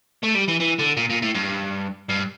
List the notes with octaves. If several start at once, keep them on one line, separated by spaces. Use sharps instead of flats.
A3
G3
E3
E3
D3
A#2
A#2
A2
G2
G2